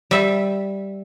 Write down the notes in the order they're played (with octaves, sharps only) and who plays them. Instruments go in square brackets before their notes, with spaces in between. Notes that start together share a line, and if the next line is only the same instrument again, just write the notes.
[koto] G3 E5